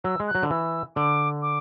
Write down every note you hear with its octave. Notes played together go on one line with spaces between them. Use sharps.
F#3 E6
G#3
F#6
F#3
D3
E3 E6
D3 D6
D6